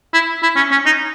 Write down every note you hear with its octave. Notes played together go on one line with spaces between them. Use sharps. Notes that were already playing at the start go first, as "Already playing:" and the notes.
E4
E4
C#4
C#4
D#4